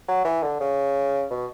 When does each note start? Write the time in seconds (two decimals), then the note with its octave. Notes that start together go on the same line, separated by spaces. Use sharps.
0.08 F#3
0.24 E3
0.42 D3
0.60 C#3
1.30 B2